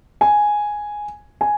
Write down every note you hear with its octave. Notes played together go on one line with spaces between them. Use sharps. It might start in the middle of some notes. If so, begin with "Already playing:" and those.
G#5
G#5